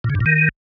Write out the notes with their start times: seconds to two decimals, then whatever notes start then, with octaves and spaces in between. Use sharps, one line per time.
0.04 A#2
0.10 C#3
0.15 G2
0.20 A#2
0.26 D#3